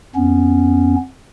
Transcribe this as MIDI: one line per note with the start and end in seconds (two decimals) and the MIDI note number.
0.16 0.96 41
0.16 0.96 59
0.16 0.96 61